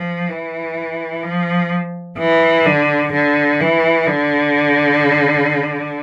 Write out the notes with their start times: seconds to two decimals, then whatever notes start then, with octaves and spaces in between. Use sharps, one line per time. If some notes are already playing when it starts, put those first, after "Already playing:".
Already playing: F3
0.29 E3
1.23 F3
2.18 E3
2.65 D3
3.13 D3
3.60 E3
4.07 D3